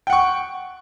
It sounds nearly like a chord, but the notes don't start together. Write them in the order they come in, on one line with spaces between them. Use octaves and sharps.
G5 F#5 C#6